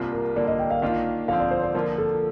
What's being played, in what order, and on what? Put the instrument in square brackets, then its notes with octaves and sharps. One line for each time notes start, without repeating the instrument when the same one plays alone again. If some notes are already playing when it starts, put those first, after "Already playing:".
Already playing: [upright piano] C2 C3 G3 A#3 F4
[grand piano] A#4
[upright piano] D3 G3 A#3 [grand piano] D5
[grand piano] D#5
G5
F5
[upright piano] D#3 A#3 D4 F4 [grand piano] F5
[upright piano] D3 F3 C4 [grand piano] F5
[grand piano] D5
C5
C5
[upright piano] D3 F3 A#3 F4 [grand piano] A#4
[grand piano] A4